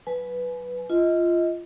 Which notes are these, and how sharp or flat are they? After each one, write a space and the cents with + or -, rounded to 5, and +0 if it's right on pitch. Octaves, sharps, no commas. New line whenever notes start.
F#3 +0 B4 +0 G#5 +30
F4 -15 D#5 +25